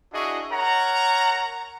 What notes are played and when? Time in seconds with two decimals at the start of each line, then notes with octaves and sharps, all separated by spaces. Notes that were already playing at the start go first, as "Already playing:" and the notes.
0.13 D4 E4 F#4 G#4 D#5 C#6
0.51 A#4 C#5 F#5 A#5